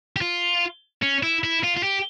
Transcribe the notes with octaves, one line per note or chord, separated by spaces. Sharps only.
G4
F4
C#4
E4
E4
F4
F4
G4